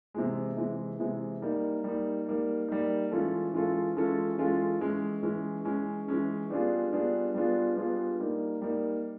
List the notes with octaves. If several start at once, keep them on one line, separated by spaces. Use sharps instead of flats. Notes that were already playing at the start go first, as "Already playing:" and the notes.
C3 E3 G#3
C3 E3 G#3
C3 E3 G#3
G3 A#3 D#4
G3 A#3 D#4
G3 A#3 D#4
G3 A#3 D#4
E3 G#3 C#4 F4 A4
E3 G#3 C#4 F4 A4
E3 G#3 C#4 F4 A4
E3 G#3 C#4 F4 A4
E3 G#3 C#4
E3 G#3 C#4
E3 G#3 C#4
E3 G#3 C#4
G3 B3 D4 F4 G#4
G3 B3 D4 F4 G#4
G3 B3 D4 F4 G#4
G3 B3 D4 F4 G#4
G3 A#3 D#4
G3 A#3 D#4